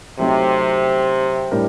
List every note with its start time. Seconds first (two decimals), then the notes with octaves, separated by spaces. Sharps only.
0.19 C3 F#3 A3 C4 D#4
1.51 A2 G3 D4 G4 A#4